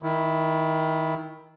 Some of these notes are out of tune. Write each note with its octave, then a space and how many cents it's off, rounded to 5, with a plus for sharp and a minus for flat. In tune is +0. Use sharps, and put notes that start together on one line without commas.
D#3 +25 E4 +0